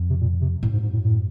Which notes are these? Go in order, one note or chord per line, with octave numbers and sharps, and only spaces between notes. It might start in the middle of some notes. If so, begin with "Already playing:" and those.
Already playing: F2
C3
A#2
C3
F#2 A2
G#2
G#2
A2
A2